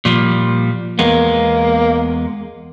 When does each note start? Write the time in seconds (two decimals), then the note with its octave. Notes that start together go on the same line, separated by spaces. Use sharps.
0.05 A#2 F3 G3
0.99 E2 G#3 A#3 B3